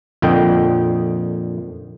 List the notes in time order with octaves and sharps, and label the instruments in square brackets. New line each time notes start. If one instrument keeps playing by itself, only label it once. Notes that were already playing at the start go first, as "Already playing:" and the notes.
[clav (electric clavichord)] F2 A#2 D3 D#5 G5